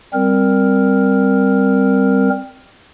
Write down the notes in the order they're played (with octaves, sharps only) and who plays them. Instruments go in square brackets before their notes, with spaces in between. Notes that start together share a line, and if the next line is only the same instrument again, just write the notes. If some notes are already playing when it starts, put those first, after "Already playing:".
[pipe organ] G3 C4 A#4